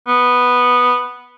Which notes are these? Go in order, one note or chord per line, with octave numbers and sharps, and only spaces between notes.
B3